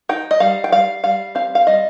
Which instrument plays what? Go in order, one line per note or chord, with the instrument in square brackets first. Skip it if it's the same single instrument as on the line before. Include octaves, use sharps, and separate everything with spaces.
[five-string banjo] D#4 G5
D#5
G3 F5
G5
G3 F5
G3 F5
C4 F5
F5
G3 D#5